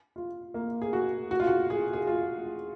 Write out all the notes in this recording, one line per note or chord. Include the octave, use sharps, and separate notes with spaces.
F4
A#3
G#4
F#4
F#4
F4
F#4
G#4
G#4
F4